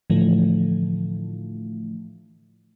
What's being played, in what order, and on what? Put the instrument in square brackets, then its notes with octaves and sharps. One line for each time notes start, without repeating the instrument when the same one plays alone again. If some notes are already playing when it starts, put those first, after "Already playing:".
[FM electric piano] A2 D3 E3 F3 A3